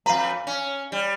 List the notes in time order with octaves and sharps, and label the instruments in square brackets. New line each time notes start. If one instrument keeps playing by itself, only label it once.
[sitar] F2 B4 [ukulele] F5 A#5
[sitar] C#4
G3